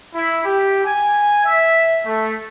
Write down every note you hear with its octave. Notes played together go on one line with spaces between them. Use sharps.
E4
G4
G#5
E5
A3